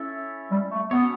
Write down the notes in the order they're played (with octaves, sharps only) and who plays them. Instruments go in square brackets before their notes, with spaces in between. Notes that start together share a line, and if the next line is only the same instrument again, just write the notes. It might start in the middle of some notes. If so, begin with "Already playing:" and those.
Already playing: [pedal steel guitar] C#4 E4 A4 C#5 E5
[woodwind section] G3
A3
[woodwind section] B3 [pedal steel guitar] C#4 F#4 A4 C#5